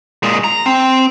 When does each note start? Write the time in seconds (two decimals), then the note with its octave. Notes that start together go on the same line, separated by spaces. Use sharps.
0.23 A#2 G#3
0.44 A#5
0.66 C4